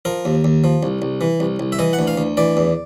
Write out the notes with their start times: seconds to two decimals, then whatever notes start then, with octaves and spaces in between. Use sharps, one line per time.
0.05 F3 A#4
0.25 D#2
0.44 D#2
0.64 F3
0.83 C2
1.02 C2
1.21 E3
1.40 C2
1.60 C2
1.72 E5
1.79 E3 D#5
1.93 F#5
1.99 D2
2.07 F5
2.18 D2
2.37 E3 D5
2.57 E2